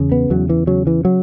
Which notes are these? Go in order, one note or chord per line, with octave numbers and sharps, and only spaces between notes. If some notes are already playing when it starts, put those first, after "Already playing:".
Already playing: E2 C#3
B3
E2 F#3
E3
C#3 F#3
E3
F#3